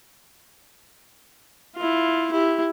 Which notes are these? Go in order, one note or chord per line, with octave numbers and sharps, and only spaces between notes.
E4 F4
E4 G4